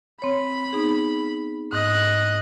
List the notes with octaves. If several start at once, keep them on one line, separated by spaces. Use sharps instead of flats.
C4 C#5 B5
B3 D#4 G#4
G#2 D#5 F#6